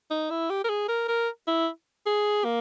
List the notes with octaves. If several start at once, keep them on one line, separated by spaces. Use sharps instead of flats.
D#4
E4
G4
A#4
G#4
A#4
A#4
E4
G#4
A#3